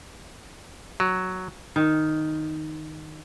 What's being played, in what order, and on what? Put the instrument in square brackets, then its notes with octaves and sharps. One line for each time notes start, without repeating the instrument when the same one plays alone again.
[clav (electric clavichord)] F#3
[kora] D#3